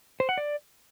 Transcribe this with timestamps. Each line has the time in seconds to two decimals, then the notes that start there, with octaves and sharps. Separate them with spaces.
0.20 C5
0.29 F#5
0.38 D5